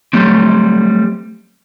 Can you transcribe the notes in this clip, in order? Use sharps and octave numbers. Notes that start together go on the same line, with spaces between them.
F#3 G3 A3 C4